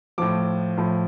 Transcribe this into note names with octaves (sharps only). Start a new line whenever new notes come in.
A2 F3 D6
A2 F3